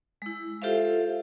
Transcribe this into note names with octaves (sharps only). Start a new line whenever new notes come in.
G#3 E4
F4 G4 A4 C5 E5 F5